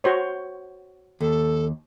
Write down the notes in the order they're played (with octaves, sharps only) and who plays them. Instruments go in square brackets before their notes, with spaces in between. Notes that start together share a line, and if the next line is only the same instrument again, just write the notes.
[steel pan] F#4 C5 C#5
[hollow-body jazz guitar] D#2 [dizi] A4